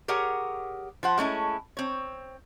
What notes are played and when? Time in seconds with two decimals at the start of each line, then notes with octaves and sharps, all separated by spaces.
0.08 G4 G#4 A#4 C#5 F#5
1.03 F3 C5 F#5
1.18 G#3 A3 C#4 E4
1.77 C4 C#5